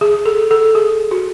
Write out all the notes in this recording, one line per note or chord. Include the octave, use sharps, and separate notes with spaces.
G#4
A4
A4
G#4
F#4